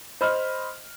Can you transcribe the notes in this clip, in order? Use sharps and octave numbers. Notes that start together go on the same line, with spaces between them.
C5 D#5 B5 F6